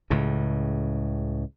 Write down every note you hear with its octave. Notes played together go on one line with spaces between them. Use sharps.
C#2 A2 C#3